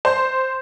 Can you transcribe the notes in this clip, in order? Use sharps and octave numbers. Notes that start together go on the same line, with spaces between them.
C5